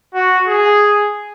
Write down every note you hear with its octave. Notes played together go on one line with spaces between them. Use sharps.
F#4
G#4